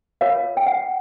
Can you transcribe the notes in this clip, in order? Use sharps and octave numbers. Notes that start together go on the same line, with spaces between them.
F4 A#4 C#5 F5
G5
F#5